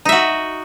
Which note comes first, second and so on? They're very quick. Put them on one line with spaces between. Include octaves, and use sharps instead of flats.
D#4 E5 F#4